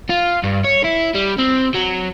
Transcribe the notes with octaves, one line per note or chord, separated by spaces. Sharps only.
F4
G2
C#5
E4
G3
C4
F#3